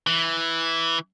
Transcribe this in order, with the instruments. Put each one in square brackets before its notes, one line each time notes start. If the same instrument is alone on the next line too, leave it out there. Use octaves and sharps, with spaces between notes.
[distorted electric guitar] E3